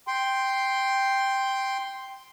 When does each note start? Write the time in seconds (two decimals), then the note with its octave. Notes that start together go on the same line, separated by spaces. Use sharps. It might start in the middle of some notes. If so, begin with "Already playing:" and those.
0.08 G5 C6